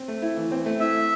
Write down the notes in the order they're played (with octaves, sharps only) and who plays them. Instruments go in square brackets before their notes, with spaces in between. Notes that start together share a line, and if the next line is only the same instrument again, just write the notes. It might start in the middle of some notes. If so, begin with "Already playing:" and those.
Already playing: [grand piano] C4
A3
E4
E3
C4
A3
[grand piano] E4 [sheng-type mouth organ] E5